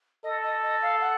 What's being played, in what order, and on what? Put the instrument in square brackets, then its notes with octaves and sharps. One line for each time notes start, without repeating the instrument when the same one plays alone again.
[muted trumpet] A4 [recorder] D#5
[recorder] D#5
D#5
F5
F#5